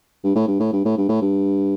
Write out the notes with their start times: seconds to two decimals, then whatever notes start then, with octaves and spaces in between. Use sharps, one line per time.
0.24 G2
0.35 A2
0.48 G2
0.60 A2
0.72 G2
0.85 A2
0.97 G2
1.09 A2
1.21 G2